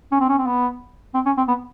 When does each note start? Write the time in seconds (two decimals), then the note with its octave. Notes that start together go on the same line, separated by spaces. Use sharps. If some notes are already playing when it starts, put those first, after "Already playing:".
0.12 C#4
0.20 C4
0.29 C#4
0.38 C4
0.46 B3
1.14 C4
1.26 C#4
1.37 C4
1.48 B3